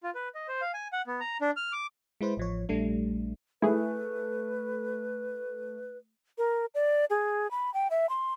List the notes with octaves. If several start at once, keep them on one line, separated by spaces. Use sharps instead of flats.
F4
B4
D#5
C5
F5
G#5
F#5
B3
A#5
D4
F6
D6
G#3 E4 B4 C5
A1 F3 C#5
A#1 G3 A3 D4
A3 E4 G#4 B4
A#4
D5
G#4
B5
G5
E5
C6